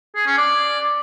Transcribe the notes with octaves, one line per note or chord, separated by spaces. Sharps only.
G#4
C#4
D5